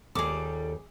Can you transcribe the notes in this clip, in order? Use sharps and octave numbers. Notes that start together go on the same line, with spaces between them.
D#2 A#2 G3 G#4 A4 D6